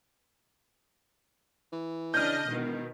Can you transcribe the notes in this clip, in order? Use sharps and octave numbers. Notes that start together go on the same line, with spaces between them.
E3
C#3 D4 D#5 F6 G6
E1 B2 D#3